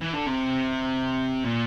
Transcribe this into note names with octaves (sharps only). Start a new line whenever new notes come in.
E3
D3
C3
A#2